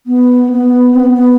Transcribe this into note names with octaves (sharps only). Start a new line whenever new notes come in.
B3
B3
C4
B3